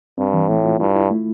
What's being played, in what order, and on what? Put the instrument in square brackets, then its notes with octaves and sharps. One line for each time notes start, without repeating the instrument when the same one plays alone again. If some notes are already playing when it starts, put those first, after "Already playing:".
[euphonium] G2 [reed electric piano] C4
[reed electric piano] E3
[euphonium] A2 [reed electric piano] A3
[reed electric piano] F4
[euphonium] G2 [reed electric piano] E4
[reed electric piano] E4
A3